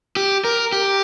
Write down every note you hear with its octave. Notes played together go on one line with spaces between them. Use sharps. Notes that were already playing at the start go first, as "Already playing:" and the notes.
G4
A#4
G4